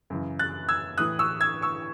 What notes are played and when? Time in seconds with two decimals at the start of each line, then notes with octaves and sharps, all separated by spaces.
0.10 F#2 C#3 E3
0.39 F#6 A6
0.69 E6 G#6
0.97 A2 E3 D#6 F#6
1.19 C#6 E6
1.41 E6 G#6
1.62 C#6 E6